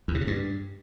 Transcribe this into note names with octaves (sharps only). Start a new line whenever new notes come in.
E2
C3
C#3
G2